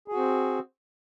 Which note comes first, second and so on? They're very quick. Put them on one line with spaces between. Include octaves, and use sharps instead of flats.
G#4 F#4 C4